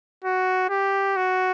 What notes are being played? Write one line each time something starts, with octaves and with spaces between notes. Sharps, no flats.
F#4
G4
F#4